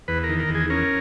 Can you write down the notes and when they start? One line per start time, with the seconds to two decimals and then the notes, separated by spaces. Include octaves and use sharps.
0.08 E2 B4
0.24 A#4
0.29 D#3
0.39 A#4
0.49 E2
0.55 G#4
0.70 C#4 A#4